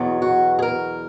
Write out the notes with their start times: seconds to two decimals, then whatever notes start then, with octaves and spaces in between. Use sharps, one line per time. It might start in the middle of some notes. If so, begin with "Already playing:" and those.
Already playing: E2 B2 F#3
0.22 F#4
0.59 G#4
0.62 A#4